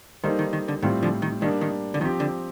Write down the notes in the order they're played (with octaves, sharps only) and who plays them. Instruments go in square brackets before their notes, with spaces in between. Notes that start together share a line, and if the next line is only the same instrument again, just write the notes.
[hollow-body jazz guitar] D#3 [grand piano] G3 A#3 D#4 A4 C5
[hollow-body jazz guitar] D#3
D#3
D3
[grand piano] A2 G3 C4 F4 C5 [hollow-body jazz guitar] D#3
[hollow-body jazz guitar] D3 F3
D#3
[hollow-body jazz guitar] D#3 [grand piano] G3 A#3 D4
[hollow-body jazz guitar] D#3
D3
[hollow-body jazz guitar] D#3 [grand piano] F3 C4 G4
[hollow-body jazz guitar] D3